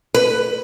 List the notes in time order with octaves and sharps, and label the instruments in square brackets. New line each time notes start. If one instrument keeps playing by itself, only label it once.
[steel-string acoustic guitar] B4